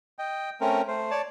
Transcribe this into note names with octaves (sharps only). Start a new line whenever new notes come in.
D#5 G5
A3 C4 C#4 A#4
A3 C5
C#5 D5 A5